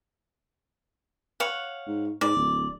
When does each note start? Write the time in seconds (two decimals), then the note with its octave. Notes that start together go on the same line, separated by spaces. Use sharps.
1.40 C#5 F5 F#5
1.87 G#2
2.21 G#2 D5
2.36 D1